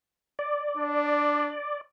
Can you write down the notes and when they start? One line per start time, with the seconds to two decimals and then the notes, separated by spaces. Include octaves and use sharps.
0.39 D5
0.77 D4